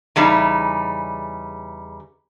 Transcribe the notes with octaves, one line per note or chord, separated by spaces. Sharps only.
E2 C#3 G3 D#4